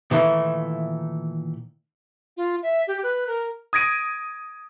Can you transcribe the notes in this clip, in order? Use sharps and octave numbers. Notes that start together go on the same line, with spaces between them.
A#2 D#3 E3 A3
F4
E5
G4
B4
A#4
D#6 G#6 A#6 D7 D#7